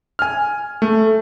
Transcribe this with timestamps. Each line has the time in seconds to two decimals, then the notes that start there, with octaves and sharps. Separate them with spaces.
0.19 G#5 F6
0.82 A3